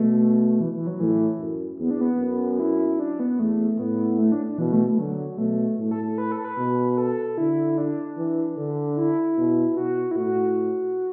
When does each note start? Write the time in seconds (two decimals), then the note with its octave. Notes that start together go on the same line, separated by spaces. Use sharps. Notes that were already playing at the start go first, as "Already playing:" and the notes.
Already playing: B2 A3
0.60 E3
0.73 E3
0.87 F#3
1.00 A2 E3
1.39 F#2
1.79 E2 B3
1.90 D4
2.01 B3
2.20 F#2
2.59 E4
2.99 D4
3.20 B3
3.39 E2 A3
3.79 A2 B3
4.19 A3
4.32 D4
4.46 D4
4.58 B2 E3
4.72 A3
4.85 A3
4.98 D3 F#3
5.38 B2 A3
5.78 A2 A3
5.91 A4
6.04 A4
6.18 B4
6.32 A4
6.45 B4
6.57 B2
6.92 B4
6.98 A4
7.38 D3 E4
7.78 D4
8.17 E3
8.57 D3
8.97 E4
9.37 B2
9.76 B2 F#4
10.11 E4
10.16 A2 F#4